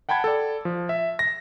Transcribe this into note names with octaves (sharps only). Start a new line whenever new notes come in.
F#5 G5 A5 B5 G#6
A4 D5
F3
E5
A#6